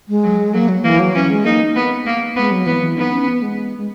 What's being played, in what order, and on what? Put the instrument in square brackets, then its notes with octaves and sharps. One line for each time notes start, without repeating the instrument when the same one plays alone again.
[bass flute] G#3
[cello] F#3
[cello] F#3 [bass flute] A#3
[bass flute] F#3
[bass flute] E3 [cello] A#3
[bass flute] F#3
[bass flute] E3 [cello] C#4
[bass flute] G#3
[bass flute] A#3 [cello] D#4
[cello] B3
A#3
[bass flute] G#3 [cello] B3
[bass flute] F#3
[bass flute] E3 [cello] B3
[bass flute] E3
[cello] B3 [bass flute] D#4
[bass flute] C#4
B3
G#3
G#3